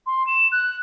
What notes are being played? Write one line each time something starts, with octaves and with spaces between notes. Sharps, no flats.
C6
E7
F#6